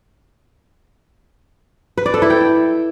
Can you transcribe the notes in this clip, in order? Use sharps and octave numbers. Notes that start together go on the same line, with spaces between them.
B4
D5
A4
E4
G5